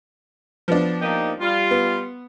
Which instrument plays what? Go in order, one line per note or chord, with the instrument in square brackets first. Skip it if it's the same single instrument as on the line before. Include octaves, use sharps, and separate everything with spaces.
[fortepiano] F3 B3 D4
[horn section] A#3 D#4 G4
G3 F4
[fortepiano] B3